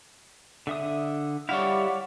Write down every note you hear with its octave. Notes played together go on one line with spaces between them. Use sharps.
D3 E5 D#6
G3 E4 C#5 D5 F5 F#5